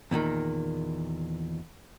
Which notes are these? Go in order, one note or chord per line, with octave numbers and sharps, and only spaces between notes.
E2 A#2 D3 D#3